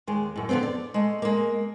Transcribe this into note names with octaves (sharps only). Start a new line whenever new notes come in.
D#2 G#3
F#2 A2
D3 F3 G3 B3 C4
D5
G#3 A3
G#3 A#3